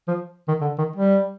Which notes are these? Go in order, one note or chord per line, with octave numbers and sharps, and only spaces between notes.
F3
D#3
D3
D#3
G3